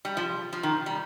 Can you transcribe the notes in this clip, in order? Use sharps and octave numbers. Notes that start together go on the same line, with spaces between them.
G3
F3
F3
D#3
G3